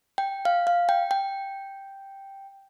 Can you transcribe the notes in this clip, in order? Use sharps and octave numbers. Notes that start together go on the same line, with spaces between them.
G5
F5
F5
G5
G5